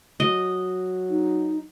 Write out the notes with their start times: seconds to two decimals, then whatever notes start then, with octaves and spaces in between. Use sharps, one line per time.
0.20 F#3 D#5
1.10 D#4